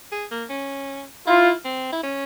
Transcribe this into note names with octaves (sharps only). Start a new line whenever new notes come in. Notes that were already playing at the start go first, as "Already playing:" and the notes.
G#4
A#3
C#4
E4 F4
C4
E4
C#4